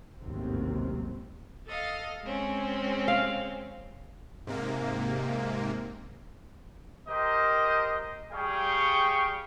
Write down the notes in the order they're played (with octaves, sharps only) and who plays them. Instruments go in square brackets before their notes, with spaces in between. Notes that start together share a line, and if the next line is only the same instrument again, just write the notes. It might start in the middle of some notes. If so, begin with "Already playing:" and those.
[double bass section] A1 D#2 G#2 C3 F#3 C4
[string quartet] A4 D#5 F5
G#3 C4 C#4
[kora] F5
[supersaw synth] G#2 C3 A#3
[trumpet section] G4 A#4 C5 D#5
G3 G#4 F5 G5 C#6